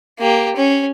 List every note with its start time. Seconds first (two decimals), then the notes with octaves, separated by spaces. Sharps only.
0.19 A#3 G4
0.56 C#4